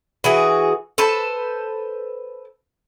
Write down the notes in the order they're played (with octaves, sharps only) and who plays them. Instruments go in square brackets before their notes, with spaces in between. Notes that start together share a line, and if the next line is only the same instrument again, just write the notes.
[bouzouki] E3 F#4 G#4
A4 B4 C5 A5